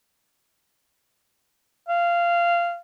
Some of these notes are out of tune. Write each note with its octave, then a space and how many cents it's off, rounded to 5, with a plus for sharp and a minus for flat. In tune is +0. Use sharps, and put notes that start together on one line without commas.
F5 -15